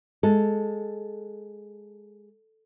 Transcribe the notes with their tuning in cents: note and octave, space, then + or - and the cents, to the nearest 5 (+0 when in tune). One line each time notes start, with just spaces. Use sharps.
G#3 +0 A4 +0